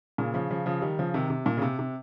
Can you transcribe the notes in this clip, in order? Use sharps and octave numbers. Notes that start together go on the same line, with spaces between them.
A#2 C#3
C#3 F3
C#3 F3
C#3 F3
D#3 G3
C#3 F3
C3 D#3
C3
A#2
C#3
C3
C3